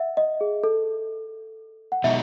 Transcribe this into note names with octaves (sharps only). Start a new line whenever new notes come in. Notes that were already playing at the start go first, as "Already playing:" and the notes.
Already playing: E5 F#5
D#5
G#4
A4
F#5
B2 G#3 D#4 E5